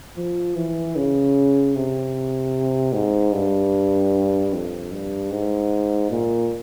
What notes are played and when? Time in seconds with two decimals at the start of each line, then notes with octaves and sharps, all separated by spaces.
0.17 F3
0.56 E3
0.96 C#3
1.76 C3
2.94 G#2
3.34 G2
4.53 F2
4.92 G2
5.32 G#2
6.10 A#2